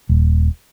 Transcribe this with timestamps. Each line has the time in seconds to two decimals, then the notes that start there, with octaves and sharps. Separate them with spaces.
0.09 D#1